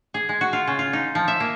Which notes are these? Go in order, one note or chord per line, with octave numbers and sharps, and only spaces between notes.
G#4
G#3
F#4
F4
C#3
F4
D#4
F3
E5
A#3